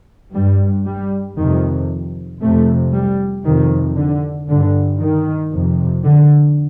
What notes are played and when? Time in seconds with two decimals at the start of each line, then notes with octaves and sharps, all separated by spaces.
0.34 G2 G3
0.86 G3
1.38 F2 C3 D#3
2.42 F2 C3 A3
2.93 G3
3.45 F2 C3 D#3
3.97 D3
4.48 G2 D3
5.00 D#3
5.52 F2 C3
6.04 D3